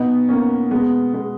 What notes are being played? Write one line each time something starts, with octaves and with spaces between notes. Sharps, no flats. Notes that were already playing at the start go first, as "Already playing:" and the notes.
Already playing: B2 B3 D#4
A#3 C#4
B2 G#3 B3
G#3 B3